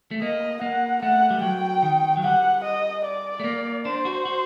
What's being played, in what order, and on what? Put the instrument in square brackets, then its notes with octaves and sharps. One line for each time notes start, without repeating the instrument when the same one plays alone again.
[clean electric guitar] A3
[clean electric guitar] A#3 [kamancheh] D#5
[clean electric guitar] A#3 [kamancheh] F#5
[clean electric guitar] A3 [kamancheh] F#5
[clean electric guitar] G3
[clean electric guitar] F#3 [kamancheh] G5
[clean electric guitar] D#3
F#3
[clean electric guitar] G3 [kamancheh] F#5
[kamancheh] D#5
D5
[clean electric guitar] A3
A#3
[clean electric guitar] D4 [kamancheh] C5
[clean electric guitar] F#4
F#4